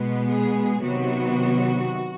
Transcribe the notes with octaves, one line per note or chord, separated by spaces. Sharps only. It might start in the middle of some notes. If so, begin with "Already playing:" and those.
Already playing: B2 G#3 B3
G#4
C3 D#3 F#3 B3 F#4